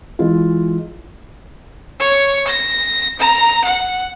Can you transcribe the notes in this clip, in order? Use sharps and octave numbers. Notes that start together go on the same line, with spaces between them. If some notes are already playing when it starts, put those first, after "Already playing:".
E3 G#3 E4 F4
C#5
A#6
A#5
F#5